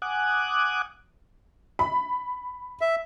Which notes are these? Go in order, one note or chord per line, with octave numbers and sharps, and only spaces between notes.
F#5 G#5 D6 D#6 F#6
B5
E5